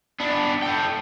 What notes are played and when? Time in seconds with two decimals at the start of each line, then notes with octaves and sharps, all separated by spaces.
0.20 B3 D4
0.63 A4 G5